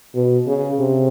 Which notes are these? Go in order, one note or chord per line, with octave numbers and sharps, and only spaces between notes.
B2
C#3
C3